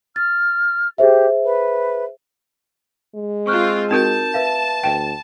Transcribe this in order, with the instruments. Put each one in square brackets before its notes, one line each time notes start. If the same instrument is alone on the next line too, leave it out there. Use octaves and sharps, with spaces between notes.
[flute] F6 [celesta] A6
[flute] G4 [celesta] G#4 C5 E5
[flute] B4
[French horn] G#3
[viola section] C4 F4 [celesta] C#6 F6 F#6
[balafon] C4 F#4 [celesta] D#4 A#4 G6 [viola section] A5
[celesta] B4 E5 F5
[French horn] D2 [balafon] D5 G5